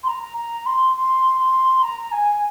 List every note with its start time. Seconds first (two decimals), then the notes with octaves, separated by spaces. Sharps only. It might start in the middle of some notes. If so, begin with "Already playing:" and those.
0.03 C6
0.07 A#5
0.37 A#5
0.66 C6
0.96 C6
1.39 C6
1.82 A#5
2.11 G#5